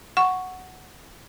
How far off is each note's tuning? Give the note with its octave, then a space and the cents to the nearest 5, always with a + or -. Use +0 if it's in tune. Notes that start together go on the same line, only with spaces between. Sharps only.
F#5 +0 C#6 +0